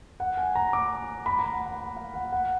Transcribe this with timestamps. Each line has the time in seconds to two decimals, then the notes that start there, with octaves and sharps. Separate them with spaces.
0.20 F#5
0.37 G#5
0.55 A#5
0.73 D6
1.26 B5
1.39 A#5
1.53 F#5
1.66 F#5
1.79 F#5
1.96 F5
2.14 F#5
2.32 F#5